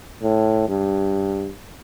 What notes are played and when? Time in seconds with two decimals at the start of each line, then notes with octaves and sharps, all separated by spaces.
0.22 A2
0.68 G2